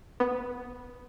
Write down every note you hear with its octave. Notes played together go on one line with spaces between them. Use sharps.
B3